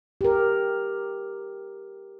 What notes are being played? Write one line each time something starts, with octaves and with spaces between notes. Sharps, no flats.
G4 A#4